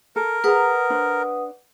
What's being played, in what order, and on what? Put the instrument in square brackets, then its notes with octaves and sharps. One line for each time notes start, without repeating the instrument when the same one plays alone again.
[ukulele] A4 [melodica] A#4
[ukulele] G#4 A#5 [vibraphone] B4 F#5 D#6
[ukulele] D4 C5